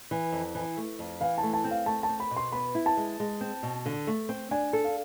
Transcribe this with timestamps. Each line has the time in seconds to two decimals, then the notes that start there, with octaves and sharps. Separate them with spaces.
0.11 E3
0.32 F2
0.55 E3
0.77 A3
0.99 F2
1.21 E3 F5
1.38 A5
1.43 A3
1.53 A5
1.64 C4
1.71 F5
1.86 A3 A5
2.03 A5
2.09 C4
2.20 B5
2.31 B2
2.36 C6
2.52 B3 B5
2.75 E4
2.86 A5
2.97 G#3
3.20 G#3
3.41 C4
3.63 B2
3.86 D3
4.07 A3
4.29 C4
4.51 D4 G#5
4.73 A4
4.84 F5